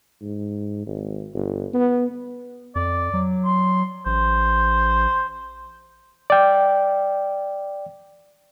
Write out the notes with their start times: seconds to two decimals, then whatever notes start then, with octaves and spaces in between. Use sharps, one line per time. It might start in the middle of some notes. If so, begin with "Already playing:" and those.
0.22 G#2
0.86 G#1
1.34 G1
1.73 B3
2.76 F2 D5
3.14 F#3
3.45 C6
4.06 A1 C5
6.30 D5 G5